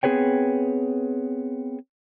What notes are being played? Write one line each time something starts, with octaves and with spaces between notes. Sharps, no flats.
B3 C4 G#4 B4 C#5 G5